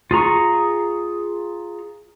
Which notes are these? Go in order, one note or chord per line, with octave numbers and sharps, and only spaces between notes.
F4 G#4 A#5 C#6